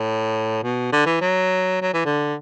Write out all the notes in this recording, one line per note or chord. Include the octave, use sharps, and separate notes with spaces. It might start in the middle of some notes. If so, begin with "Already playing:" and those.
Already playing: A2
B2
D3
E3
F#3
F#3
E3
D3